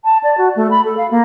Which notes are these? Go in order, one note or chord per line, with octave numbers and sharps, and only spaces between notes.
A5
D5
F#4
A3
B5
A4
F5
A#3